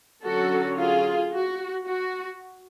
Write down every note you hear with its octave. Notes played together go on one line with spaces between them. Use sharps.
D3 F#3 C#4 F#4 A4
F4 G#4
F#4
F#4